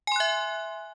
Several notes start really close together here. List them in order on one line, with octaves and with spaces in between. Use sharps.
G#5 C6 F#6 E5